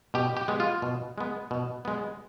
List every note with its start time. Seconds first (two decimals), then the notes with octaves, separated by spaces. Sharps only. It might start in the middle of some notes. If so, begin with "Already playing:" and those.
0.14 B2 G4
0.37 G4
0.48 G#3 B3
0.60 F4
0.82 B2
1.18 G#3 B3
1.51 B2
1.85 G#3 B3